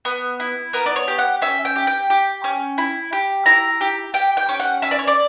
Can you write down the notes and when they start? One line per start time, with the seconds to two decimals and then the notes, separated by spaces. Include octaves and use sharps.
0.05 B3
0.40 E4
0.73 B3 A#4
0.86 D5
0.96 C#5
1.08 G4
1.19 F#5
1.42 C#4 E5
1.65 G5
1.76 G4
1.87 G5
2.10 G4
2.44 C#4
2.78 E4
3.13 G4
3.46 E4 A#5
3.81 G4
4.14 G4 G5
4.37 G5
4.49 C#4
4.60 F#5
4.82 C#4 E5
4.91 D5
4.99 C#5
5.07 D5